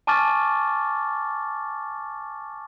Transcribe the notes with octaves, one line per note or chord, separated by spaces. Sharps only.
G#5 A5 C#6 D6 F6 A6